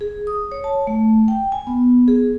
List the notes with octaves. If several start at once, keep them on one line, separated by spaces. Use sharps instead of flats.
G#4
D#6
C#5
A5
A3
G5
G#5
B3
G#4